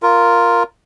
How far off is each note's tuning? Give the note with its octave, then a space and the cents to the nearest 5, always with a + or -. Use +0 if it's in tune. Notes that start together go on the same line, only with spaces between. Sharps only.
F4 +0 A#4 +0